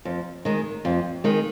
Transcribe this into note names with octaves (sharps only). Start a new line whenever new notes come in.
F2
D#3 G#3
F2
D#3 G#3